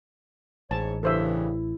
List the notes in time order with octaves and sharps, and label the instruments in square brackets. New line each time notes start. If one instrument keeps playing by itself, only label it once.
[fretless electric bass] A1 [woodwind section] G#2 C#5 [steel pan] A5
[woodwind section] G2 C#3 E3 [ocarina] E4 [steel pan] A4 C5 E5